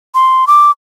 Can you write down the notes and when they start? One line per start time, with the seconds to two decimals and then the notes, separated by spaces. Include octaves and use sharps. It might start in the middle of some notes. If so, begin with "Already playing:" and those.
0.15 C6
0.47 D6